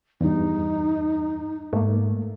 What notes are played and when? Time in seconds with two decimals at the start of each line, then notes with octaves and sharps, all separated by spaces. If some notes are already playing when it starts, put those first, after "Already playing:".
0.21 E2 G2 D#4
1.73 G#2 A3 A#3